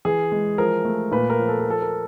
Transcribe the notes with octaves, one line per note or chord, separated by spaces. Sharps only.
E3 G#4
G#3
F3 A#4
A3
A#2 B4
A#4
F3
A4
A#4
F3 A4
A#4